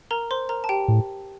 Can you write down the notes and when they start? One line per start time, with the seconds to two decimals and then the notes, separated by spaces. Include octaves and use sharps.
0.11 A#4 A#5
0.31 C5 C6
0.49 A#4 A#5
0.64 A5
0.69 G4 G5
0.88 A2